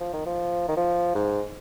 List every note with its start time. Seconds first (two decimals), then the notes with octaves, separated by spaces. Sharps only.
0.01 F3
0.14 D#3
0.26 F3
0.69 D#3
0.77 F3
1.15 G#2